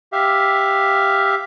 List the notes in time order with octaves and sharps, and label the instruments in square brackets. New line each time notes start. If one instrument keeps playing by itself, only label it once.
[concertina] G4 E5 F5